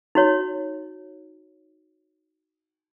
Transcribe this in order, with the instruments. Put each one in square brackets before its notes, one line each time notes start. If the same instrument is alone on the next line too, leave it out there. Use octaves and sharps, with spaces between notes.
[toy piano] D#4 F#4 C#5